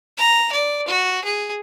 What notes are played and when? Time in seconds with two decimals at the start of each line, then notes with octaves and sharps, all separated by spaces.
0.17 A#5
0.52 D5
0.88 F#4
1.24 G#4